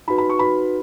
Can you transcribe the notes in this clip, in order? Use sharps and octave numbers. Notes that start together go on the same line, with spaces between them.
D#4 F#4 B4 B5
B5
C#6
D#4 F#4 B4 B5